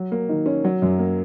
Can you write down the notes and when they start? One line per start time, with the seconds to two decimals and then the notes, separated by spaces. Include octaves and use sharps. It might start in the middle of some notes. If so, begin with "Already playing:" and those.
Already playing: F#3
0.12 A#3
0.29 D#3
0.46 C#4
0.64 F#3
0.82 F#2
0.99 A#3